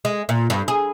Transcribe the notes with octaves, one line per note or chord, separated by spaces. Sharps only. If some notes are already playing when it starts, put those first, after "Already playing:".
G#3
A#2
G2
G#4